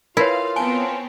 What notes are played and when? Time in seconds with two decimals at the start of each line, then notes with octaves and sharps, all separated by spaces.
0.17 E4 F4 A#4 B4 C#5 F5
0.56 B3 C4 C#5 G#5 A5 D7